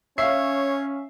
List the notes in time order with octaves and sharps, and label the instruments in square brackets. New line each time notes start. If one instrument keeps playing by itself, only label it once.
[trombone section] C#4 [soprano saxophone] C#5 [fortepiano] E5 [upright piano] F5 C7